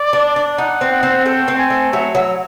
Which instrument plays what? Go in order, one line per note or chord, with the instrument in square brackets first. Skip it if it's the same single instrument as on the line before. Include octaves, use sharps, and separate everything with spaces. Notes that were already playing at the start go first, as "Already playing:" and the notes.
Already playing: [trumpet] D5
[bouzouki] D4
D4
[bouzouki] D#4 [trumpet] F#5
[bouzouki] C4
[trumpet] F#5
[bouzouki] C4
[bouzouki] A3 [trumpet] G5
[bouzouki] C4
[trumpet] G#5
[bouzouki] A3
[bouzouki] F#3 [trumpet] E5
[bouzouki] F#3